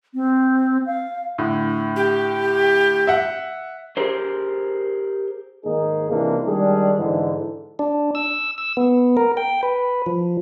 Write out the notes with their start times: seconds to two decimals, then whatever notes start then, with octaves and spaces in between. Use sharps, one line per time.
0.14 C4
0.86 F5
1.38 A2 D3
1.96 G4
3.07 E5 F#5
3.97 G4 G#4 A#4 C5
5.64 G#2 D#3 A#3 D#4 G#4
6.10 C#2 C3 E3 G#3 A#3 D4
6.46 D#3 G3 G#3 D4 G#4
6.99 G#2 D3 E3
7.79 D4
8.15 E6
8.58 E6
8.77 B3
9.17 A#4
9.37 G5
9.63 B4
10.06 F3